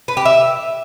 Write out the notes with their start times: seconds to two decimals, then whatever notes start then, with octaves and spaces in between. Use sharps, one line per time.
0.08 B4
0.17 G4
0.25 E5